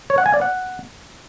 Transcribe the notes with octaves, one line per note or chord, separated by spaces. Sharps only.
C#5
F#5
G#5
D5
F#5